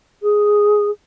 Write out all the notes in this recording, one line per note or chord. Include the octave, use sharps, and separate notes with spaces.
G#4